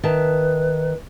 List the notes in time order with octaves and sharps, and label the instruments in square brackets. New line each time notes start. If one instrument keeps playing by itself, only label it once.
[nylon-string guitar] D#3 E5 A5 [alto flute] B4